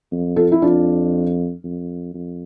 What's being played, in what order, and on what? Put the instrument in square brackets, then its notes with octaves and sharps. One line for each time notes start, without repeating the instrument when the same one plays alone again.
[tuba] F2
[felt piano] F4 A4
E4
[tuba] F2 [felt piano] D4 F4
[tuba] F2
F2